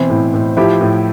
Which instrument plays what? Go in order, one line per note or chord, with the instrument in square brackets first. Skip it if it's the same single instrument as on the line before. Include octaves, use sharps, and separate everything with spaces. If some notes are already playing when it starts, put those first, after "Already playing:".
Already playing: [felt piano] B2 E3 C4 E4
A2
A2
F3 E4 G4
A2